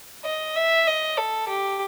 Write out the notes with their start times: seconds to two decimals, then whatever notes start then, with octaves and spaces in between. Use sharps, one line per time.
0.25 D#5
0.56 E5
0.87 D#5
1.18 A4
1.48 G4